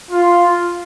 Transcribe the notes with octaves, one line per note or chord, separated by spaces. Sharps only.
F4